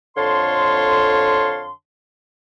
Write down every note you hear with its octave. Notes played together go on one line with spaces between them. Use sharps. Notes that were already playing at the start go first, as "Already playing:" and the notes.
F2 D3 C#5 F5 A5 C6